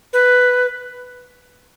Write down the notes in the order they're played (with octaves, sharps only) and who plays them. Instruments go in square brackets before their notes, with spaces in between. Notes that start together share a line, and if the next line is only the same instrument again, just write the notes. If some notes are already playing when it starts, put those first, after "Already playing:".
[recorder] B4